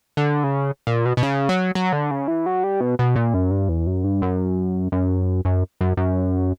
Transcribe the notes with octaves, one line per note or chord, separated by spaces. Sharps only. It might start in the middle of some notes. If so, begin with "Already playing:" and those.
D3
C#3
A#2
B2
B2
C#3
F#3
F#3
D3
C#3
E3
F#3
G3
B2
B2
A#2
F#2
G2
E2
F#2
G2
F#2
F#2
F#2
F#2
F#2